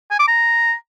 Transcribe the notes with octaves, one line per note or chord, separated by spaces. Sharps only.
G#5
D6
A#5